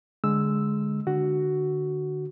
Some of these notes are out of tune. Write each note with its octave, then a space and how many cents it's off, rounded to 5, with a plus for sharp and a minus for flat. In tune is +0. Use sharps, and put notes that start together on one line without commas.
D3 -5 G#3 +5 E6 +0
D3 +15 F#4 +10